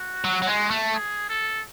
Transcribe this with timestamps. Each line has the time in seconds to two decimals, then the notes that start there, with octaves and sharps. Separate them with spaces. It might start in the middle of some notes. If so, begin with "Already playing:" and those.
Already playing: F#4
0.24 F#3
0.42 F#3
0.47 G#3
0.71 A3
0.94 G#4
1.29 A4